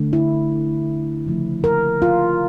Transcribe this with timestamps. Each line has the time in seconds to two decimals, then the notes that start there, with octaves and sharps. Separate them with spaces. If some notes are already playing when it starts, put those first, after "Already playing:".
Already playing: D3 A3
0.13 E4
1.26 C#3 F3 A3
1.64 A#4
2.02 F4